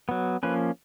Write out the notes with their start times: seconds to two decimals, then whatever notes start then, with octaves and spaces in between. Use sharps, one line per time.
0.09 F#3 B3
0.43 F3 A#3 C#4 B4